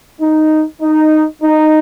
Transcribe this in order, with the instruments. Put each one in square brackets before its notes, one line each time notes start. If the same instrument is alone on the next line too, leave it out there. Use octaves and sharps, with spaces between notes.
[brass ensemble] D#4
D#4
D#4